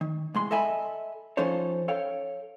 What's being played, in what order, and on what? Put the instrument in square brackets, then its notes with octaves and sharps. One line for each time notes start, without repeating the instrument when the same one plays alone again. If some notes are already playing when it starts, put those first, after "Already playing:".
[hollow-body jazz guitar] D#3
C2 G#3 C6
A4 D#5 E5 G#5 B5
F3 C#4 D#4 A4 C5 C#5
A4 C#5 F5 G5